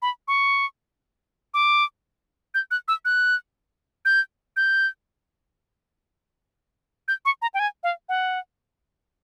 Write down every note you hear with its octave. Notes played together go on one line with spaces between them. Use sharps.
B5
C#6
D6
G6
F#6
E6
F#6
G6
G6
G6
C#6
A#5
G5
G#5
F5
F#5